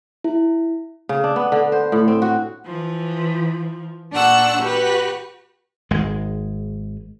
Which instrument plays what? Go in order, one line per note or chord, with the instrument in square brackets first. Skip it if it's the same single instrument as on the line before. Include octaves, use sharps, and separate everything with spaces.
[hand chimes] E4
[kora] C#3
D4
B3
D3
C5
A2
C4
F#4
[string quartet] E3 F3
A#2 D4 F#5 C#6 E6
F#4 G4 B4
[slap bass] G#1 G#3